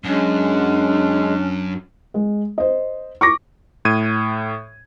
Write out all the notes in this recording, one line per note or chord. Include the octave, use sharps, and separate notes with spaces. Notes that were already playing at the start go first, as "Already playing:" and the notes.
F#2 G#3 C#4 D4
G#3
C5 D#5
C#6 D6 A#6
A2 G#6 D#7